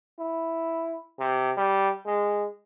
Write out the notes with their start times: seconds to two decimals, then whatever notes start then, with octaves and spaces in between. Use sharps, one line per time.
0.20 E4
1.19 C3
1.57 G3
2.06 G#3